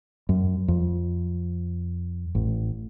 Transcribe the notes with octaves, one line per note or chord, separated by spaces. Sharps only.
F#2
F2
A1